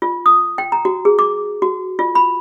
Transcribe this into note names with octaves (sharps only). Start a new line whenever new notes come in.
F4
D#6
G5
A#5
F#4
G#4
D6
F#4
F4
B5